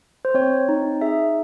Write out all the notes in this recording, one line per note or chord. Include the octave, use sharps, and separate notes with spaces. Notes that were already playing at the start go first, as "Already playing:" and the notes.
C5
C4 C#5
D#4
G#4 E5